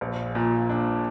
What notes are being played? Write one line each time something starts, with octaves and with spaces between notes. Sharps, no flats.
A#1
A#2
D4